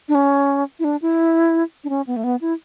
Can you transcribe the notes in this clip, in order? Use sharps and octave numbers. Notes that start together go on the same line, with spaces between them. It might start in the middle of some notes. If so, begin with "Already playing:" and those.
D4
C#4
E4
D4
E4
D4
C#4
B3
A3
B3
E4